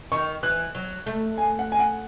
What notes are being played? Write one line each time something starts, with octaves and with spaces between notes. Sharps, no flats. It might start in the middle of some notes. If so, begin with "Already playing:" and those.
D#3 C#6
E3 F#6
F#3
A3
G#5
F#5
G#5
F#5